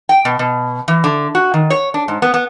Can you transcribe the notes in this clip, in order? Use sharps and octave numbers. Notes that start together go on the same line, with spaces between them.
G5
B2
B2
E3
D3
F#4
D#3
C#5
D4
G#2
B3
B3